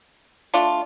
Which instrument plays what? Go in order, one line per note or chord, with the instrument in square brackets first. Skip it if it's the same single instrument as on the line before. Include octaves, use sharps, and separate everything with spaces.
[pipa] A3 D4 F4